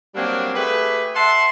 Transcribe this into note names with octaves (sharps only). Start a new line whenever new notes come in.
F#3 G3 A#3 C4 D4
A3 G4 G#4 B4
E5 F#5 A5 C6